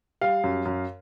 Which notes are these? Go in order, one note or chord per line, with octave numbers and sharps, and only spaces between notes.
G3 F5
F#2
F#2